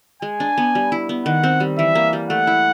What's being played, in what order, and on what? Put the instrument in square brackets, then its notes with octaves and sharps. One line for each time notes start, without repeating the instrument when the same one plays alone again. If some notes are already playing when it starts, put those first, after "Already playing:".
[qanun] G#3 [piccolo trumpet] G#5
[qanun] D4
B3
G3
E4
B3
[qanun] D#3 [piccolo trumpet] F#5
[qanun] C4
G3
[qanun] E3 [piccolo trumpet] E5
[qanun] A#3
G3
[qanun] A3 [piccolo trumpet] F#5
[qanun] E4